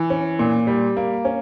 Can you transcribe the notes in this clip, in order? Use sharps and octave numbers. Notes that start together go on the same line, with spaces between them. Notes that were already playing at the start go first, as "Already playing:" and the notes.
Already playing: E3
C#4
A#2
G3
A#3
C#4